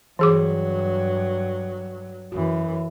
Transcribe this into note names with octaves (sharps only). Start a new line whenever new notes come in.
G2 E3 F#3 G#4 D6
F#2 E3 F#4